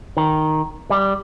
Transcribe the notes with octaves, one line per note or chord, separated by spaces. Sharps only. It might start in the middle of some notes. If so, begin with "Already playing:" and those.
D#3
G3